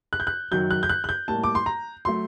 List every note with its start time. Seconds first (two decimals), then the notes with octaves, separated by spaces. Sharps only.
0.13 F#6
0.20 G6
0.27 F#6
0.51 F#2 D#3 F#3 G6
0.71 F#6
0.83 G6
0.89 F#6
1.04 F#6
1.09 G6
1.28 A2 G3 A#3 A5
1.44 D6
1.55 C6
1.66 A#5
2.05 F#3 A3 C6